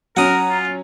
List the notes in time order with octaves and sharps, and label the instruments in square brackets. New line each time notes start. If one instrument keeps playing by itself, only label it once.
[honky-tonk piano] F#3 C#4 [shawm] A#4 [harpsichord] F#5 D#6 [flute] A#5
[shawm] F4